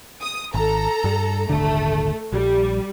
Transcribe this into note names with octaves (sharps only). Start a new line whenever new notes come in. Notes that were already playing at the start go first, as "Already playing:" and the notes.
D#6
G#1 A4 A#5
G2 G3
D#1 G#1 D3 A3
A#1 G3